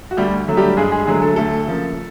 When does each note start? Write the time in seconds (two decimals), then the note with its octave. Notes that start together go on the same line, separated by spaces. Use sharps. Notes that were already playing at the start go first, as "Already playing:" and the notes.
0.11 F#4
0.17 D2 G3 G4
0.48 D3 F#3 A3
0.57 G3 G4
0.77 G2 G#3 G#4
0.92 G#3 G#4
1.06 D3 F#3 G#3 A3 G#4
1.22 A3 A4
1.36 D2 A3 A4
1.67 C#3 F3 A#3